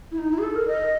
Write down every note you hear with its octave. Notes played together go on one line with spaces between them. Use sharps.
E4
D#4
E4
G#4
A4
A#4
D#5